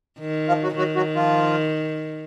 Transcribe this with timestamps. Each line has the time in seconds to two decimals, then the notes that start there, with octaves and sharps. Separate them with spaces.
0.19 D#3
0.48 F3 F4
0.63 F#3 F#4
0.77 D#3 F#3 F#4
0.96 F#3 F#4
1.15 F3 F4